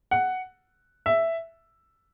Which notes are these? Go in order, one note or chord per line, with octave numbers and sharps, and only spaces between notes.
F#5
E5